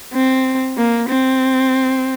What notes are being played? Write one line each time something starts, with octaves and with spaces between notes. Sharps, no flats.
C4
A#3
C4